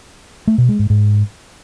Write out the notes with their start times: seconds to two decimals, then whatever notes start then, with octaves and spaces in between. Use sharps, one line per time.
0.47 A3
0.58 B2
0.69 G#3
0.79 G#2
0.90 G#2